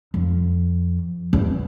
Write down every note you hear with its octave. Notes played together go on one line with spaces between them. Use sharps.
F2
E2